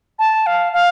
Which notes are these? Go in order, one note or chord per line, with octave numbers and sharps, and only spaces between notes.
A5
F5
F5